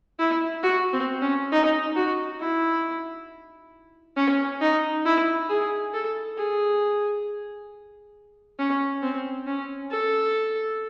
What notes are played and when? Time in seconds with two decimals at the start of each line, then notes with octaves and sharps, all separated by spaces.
0.19 E4
0.63 F#4
0.93 C4
1.22 C#4
1.52 D#4
1.96 F#4
2.40 E4
4.16 C#4
4.61 D#4
5.05 E4
5.49 G#4
5.93 A4
6.38 G#4
8.59 C#4
9.03 C4
9.47 C#4
9.91 A4